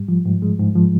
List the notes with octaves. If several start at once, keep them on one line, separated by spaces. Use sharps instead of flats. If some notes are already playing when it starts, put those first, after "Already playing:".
Already playing: G#2 G3
F3
G#2
G#3
G#2
F3